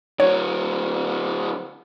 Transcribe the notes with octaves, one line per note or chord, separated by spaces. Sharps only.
D3 F#3 C#5